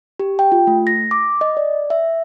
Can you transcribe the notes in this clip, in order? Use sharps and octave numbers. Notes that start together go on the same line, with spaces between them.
G4
G5
F4
A3
A#6
D6
D#5
D5
E5